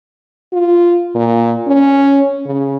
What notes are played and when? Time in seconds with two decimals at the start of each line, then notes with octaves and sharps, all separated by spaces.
0.53 F4
1.15 A#2
1.68 C#4
2.46 C#3